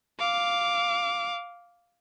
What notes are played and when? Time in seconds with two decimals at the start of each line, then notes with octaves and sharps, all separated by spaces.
0.20 F5 D6